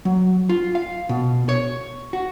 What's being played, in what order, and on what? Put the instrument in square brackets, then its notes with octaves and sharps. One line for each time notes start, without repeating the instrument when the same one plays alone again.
[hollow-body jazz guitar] F#3
F4
F5
B2
C#5
F#4